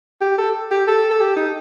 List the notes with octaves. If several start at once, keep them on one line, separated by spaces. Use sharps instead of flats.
G4
A4
G4
A4
A4
G4
D#4